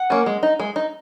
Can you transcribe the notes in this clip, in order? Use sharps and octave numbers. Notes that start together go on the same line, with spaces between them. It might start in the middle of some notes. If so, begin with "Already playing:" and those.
Already playing: F#5
A#3 C#4
G#3
D#4
G#3
D#4